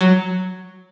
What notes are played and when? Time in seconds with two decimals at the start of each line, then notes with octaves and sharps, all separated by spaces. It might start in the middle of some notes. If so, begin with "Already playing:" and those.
0.01 F#3